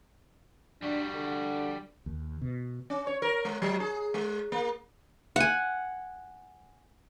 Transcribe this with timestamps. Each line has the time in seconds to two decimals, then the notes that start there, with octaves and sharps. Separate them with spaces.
0.82 G3 D4 F#4
1.15 D3
2.06 D#2
2.41 B2
2.90 C#4
3.07 C#5
3.22 A#4
3.45 G#3
3.62 F#3
3.80 G#4
4.14 G#3
4.52 A#3
5.36 F#5 G#5